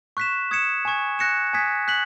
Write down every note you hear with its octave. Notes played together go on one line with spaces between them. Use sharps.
C#6 F#6 B6 E7
D#6 G#6 C#7 E7
G#5 C#6 G#6
F#6 A#6 C#7 E7
G#5 D#6 G#6 B6
F#6 B6 F#7